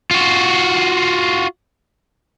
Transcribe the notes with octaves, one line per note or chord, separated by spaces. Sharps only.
F4 F#4